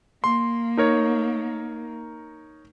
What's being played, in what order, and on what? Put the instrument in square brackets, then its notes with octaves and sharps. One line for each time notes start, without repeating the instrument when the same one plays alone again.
[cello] A#3 [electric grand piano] C6
[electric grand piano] D#4 A#4 C#5